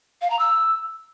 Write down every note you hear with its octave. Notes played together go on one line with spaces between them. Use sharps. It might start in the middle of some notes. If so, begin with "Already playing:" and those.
F5
A#5
E6